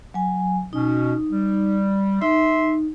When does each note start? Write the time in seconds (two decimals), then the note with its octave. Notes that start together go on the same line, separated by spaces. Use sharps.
0.14 F#3 G#5
0.73 B2 C#4 D#4
1.31 G3
2.22 D#4 E5 C6